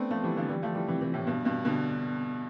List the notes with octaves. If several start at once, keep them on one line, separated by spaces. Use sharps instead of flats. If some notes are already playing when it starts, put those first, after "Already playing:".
Already playing: A3 B3 C4 D4
F3 A3
E3 G3
D3 F3
E3 G3
F3 A3
E3 G3
C3 E3
C3 E3
A2 C3
G2 B2
G2 B2
B2 D3